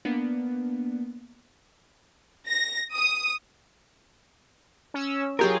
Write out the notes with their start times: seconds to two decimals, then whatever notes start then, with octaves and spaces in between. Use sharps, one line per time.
0.05 A#3 B3 D4
2.49 A#6
2.95 D#6
4.94 C#4 E6
5.39 F#3 F4 G4 G#4 A#4